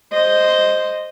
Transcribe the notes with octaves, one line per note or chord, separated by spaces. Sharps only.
C5 D#5